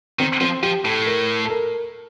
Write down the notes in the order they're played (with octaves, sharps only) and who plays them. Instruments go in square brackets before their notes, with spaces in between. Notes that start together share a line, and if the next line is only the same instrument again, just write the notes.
[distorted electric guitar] D#3 [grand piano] C4
[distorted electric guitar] F3 [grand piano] C4
[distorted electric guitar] F3 [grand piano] G4
[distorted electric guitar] A2 [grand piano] A4
[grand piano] A#4
A4
A#4